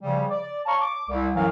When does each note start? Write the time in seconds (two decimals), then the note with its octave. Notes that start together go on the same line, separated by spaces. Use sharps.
0.02 C#3 F3 G3
0.30 D5
0.66 C#5 F5 A5 A#5 C#6
0.81 D6
1.09 C2
1.35 F#2 A2 E3 F#3 F5